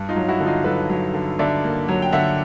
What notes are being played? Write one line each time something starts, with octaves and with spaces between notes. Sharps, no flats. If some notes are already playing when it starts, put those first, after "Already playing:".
Already playing: G2
D#4 F4
F#3
E4 F#4
D3
D#4 F4
F#3 A4 B4
F#3
D3
D3 D5 E5
A#3
F#3
G5
D3 E5 F#5